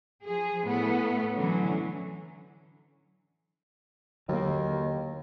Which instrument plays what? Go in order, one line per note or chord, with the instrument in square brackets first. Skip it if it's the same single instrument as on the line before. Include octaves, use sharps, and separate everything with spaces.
[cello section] F3 G#4
A2 A3 B3
D3 E3 F#3 C#4
[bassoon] D#2 [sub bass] D3 [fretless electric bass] F#3 A#3